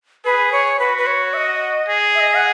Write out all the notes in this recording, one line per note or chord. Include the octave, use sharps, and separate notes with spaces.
G#4 B4
C#5
F#4 B4
B4
C#5
E5
D#5
G#4
E5
D#5
F#5